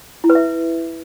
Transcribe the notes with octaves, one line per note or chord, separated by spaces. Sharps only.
E4
B4
E5